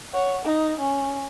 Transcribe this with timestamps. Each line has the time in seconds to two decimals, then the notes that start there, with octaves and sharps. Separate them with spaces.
0.13 C#5 F#5
0.45 D#4
0.80 C#4